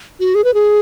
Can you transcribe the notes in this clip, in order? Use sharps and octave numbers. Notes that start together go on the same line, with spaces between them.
F#4
G#4
B4
G#4